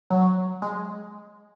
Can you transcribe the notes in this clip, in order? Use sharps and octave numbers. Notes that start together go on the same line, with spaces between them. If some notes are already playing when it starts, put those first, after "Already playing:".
F#3
G#3